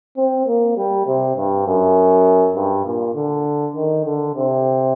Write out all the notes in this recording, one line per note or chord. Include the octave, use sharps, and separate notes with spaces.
C4
A#3
G3
C3
G2
F#2
G2
A#2
D3
D#3
D3
C3